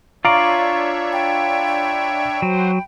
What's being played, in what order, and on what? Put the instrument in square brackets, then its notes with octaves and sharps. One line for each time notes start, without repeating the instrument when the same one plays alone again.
[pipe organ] D4 C#5 E5 [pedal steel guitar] F4 D5 [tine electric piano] F5 A#5 [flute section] C#6
[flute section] G5 B5
[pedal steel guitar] F#3 [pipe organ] F#4 C5